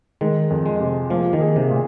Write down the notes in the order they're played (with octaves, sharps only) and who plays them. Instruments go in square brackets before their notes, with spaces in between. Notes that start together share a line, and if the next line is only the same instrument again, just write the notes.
[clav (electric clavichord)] D#3 [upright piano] G#3
[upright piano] F2
[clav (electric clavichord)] G#3
[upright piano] C3
[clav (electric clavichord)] F3 [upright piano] A#3
[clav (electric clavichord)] D#3
[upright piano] G#4
[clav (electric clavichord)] C3
[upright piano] A#2